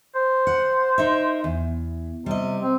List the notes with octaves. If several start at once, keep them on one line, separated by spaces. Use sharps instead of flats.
C5
F#5
D#4 A#4 E5
E2
C3 G3 D#5
C4